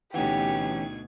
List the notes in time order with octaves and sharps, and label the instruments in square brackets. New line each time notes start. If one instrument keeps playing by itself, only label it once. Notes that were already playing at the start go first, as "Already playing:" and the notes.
[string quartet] D2 B2 G#6 [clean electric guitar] E3 C#4 [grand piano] D#4 F#5 [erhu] G4